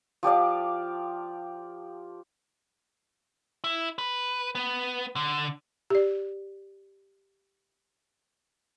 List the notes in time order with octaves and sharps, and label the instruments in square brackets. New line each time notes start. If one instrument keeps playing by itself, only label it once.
[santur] F3 G4 D5 F5
[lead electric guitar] E4
B4
B3
D3
[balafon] G4 D5